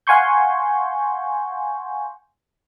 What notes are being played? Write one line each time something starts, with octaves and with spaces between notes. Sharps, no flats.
F5 F#5 G#5 C6 C#6 G6